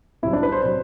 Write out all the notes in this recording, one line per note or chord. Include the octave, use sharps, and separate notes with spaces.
C2 C3 F#3 E4
D4
B4
C5
C3 F#3 C5